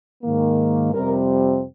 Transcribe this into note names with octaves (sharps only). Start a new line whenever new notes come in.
G#2 D#3 A#3
F2 C3 G3 C4 A#4